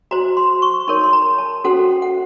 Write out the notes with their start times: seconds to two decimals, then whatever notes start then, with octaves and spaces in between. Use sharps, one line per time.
0.11 F#4 C5 A#5
0.37 C6
0.62 C#6
0.88 D#4 A#4 C#5 C6
1.03 C6
1.13 A#5
1.38 A5
1.64 C#4 F#4 A4 C5 F#5
2.02 F#5